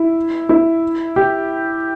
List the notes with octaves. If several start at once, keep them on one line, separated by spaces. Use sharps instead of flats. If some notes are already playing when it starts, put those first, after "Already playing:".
Already playing: E4
E4
G4